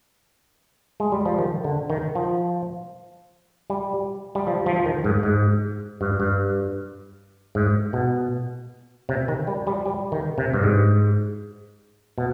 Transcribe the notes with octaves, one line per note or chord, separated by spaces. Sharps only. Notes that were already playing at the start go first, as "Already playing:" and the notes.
G#3
G3
F3
D#3
D3
D#3
F3
G3
G3
F3
F3
F3
D#3
G#2
G#2
G2
G2
G#2
B2
C3
D#3
G3
G3
G3
D#3
C3
G2
G#2
B2